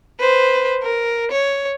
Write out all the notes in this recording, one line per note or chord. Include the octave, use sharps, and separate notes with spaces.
B4 C5
A#4
C#5